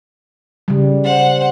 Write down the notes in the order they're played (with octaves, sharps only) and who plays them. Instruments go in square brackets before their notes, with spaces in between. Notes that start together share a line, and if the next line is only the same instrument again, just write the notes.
[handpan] C#3 G3
[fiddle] C5 F#5